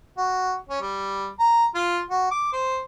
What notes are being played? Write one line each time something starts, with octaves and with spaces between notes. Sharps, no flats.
F#4
C#4
G3
A#5
F4
F#4
D6
C5